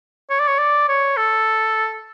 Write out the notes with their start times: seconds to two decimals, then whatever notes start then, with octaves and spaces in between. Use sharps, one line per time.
0.30 C#5
0.40 D5
0.48 C#5
0.59 D5
0.88 C#5
1.17 A4